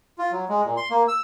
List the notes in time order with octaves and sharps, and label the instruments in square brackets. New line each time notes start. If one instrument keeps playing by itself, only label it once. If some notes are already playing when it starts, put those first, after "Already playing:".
[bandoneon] F4
F#3
G#3
A#2
C6
A#3
E6